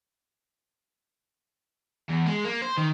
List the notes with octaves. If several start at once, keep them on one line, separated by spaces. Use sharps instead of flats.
E2
G#3
A#3
C5
D#3